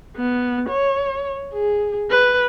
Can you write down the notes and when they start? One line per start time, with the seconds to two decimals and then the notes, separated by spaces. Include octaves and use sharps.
0.17 B3
0.70 C#5
1.53 G#4
2.10 B4